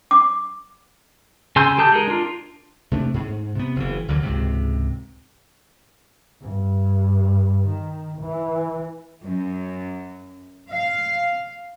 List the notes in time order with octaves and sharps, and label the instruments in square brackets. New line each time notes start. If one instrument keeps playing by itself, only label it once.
[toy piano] D6
[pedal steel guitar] C#3 G#5 C6 E6 G6
G4 A4 A5 D#6 G6
G#3 D#4 A#4
D4 F4
[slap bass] C3 A3 C#4 D4
G#2
C3 B3
F#1 E3
D2 D3 F#3
C#2 G#2 C3
[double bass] G2
D#3
E3
[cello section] F#2
F5